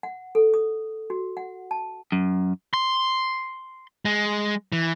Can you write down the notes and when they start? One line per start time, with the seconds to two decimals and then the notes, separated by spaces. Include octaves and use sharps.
0.03 F#5
0.35 A4
0.54 D#6
1.10 F#4
1.37 F#5
1.71 A5
2.12 F#2
2.74 C6
4.05 G#3
4.72 E3